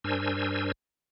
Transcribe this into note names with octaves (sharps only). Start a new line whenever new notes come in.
G2 D4 A#4 C5 G#5 E6